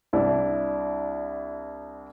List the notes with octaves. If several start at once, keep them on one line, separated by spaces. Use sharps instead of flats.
C2 D4 E4